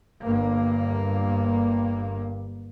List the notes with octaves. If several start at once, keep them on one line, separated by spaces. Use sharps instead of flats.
G1 G2 A#3